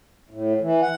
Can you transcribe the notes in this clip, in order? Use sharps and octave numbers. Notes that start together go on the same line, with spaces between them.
A2
E3
F#5